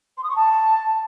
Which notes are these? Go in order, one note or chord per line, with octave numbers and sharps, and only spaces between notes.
C6
D#6
C#6
A5